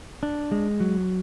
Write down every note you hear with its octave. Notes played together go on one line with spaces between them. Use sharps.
D4
G#3
F#3